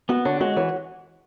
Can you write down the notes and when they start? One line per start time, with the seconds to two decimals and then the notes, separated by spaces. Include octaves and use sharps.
0.09 B3 F#4
0.25 D3 D4 C#5
0.41 G#3 F#4
0.56 E3 C#5